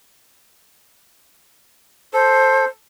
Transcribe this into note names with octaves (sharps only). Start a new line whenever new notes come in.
A4 C5